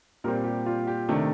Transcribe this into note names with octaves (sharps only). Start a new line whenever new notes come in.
A#2 G3 C4 A#4
G4
F4
G4
C3 D#3 A3 D4